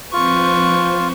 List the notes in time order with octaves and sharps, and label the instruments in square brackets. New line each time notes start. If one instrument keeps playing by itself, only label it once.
[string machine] F3 C4 C5 [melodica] F4 [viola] B4 C#6